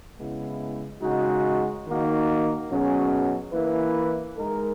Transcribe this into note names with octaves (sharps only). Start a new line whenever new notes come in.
C#3 G#3 B3 E4
C#3 G#3 D#4 F#4
D#3 A#3 D#4 F#4
B2 F#3 C#4 G#4
E3 A#3 E4 B4
G#3 D#4 A#4